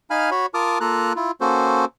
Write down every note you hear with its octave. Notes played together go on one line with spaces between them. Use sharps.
D#4 F5 G#5 B5 F6
F#4 C#5 B5
F4 A#4 A5 D6 D#6 F6
A#3 F4 A4 A#5 F#6
E4 F4
A#3 C#4 F#4 A4 C5